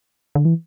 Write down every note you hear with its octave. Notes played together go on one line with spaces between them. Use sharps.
D3
E3